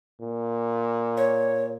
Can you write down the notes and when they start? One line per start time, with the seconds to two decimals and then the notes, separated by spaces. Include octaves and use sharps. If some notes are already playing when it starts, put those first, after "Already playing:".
0.21 A#2
1.17 C#5